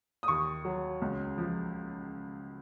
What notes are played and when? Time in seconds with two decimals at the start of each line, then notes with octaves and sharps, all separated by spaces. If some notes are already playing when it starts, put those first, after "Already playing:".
0.23 D#6
0.28 D#2 C#6
0.65 F#3
1.02 C#2
1.38 F3